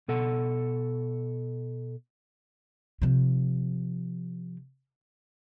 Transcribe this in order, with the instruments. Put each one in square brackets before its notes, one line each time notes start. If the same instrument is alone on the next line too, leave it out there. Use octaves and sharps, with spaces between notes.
[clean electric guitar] B2 A4 F#5
[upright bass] C3 F3